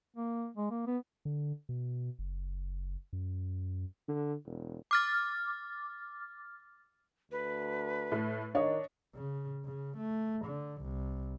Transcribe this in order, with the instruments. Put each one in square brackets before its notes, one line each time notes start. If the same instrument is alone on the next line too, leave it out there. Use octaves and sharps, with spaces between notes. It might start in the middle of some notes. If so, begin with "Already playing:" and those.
[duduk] A#3
G#3
A#3
B3
[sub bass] D3
B2
F#1
F#2
[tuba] D3
E1
[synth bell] D6 F6 A6
[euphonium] D2 [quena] B4
[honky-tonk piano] A2 A3
[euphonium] D#3 [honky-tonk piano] D4 [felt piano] C#5 D#5
[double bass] C#3
C#3
A3
D3
C2